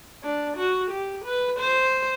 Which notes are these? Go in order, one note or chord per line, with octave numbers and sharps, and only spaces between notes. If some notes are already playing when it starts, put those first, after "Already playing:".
D4
F#4
G4
B4
C5